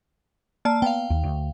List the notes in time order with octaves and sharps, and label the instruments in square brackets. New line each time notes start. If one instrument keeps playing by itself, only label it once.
[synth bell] A#3 D5 A5
[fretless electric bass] B3 [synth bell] F5 G5
[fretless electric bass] D#2
D2